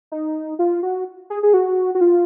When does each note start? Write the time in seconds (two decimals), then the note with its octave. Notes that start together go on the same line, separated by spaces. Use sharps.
0.12 D#4
0.59 F4
0.83 F#4
1.30 G#4
1.43 G#4
1.54 F#4
1.95 F#4
2.01 F4